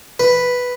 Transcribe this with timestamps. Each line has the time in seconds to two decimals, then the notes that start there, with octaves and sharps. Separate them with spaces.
0.20 B4